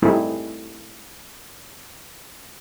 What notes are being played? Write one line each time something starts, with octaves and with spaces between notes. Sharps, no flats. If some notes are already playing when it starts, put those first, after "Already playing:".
G3 A3 C4 D#4 E4 G#4